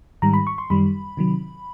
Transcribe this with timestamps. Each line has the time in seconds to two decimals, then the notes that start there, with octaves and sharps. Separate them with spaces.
0.22 G#2 D#3 G3 A#5
0.34 B5
0.47 C#6
0.58 C6
0.70 F#2 D#3 G3 B5
1.17 C3 D#3 F#3